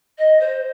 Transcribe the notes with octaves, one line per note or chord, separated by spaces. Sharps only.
D#5
C5